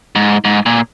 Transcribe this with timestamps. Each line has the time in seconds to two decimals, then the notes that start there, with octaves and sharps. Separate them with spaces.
0.15 G#2
0.45 G#2
0.66 A#2